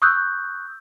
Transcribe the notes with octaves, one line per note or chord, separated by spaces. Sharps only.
C#6 D#6 E6 F#6 G6